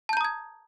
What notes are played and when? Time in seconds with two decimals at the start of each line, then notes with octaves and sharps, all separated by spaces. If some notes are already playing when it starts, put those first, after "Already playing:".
0.09 A5
0.13 G6
0.17 A#5
0.21 D#6
0.25 G#6